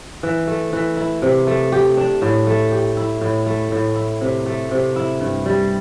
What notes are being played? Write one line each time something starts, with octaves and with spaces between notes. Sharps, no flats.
E3
A3
E3
E4
C3
A3
G4
D4
A2
A3
G4
E4
A2
A3
A2
E4
C3
A3
C3
E4
G2
G3